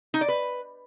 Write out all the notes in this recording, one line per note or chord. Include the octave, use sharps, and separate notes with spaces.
D#4
D5
B4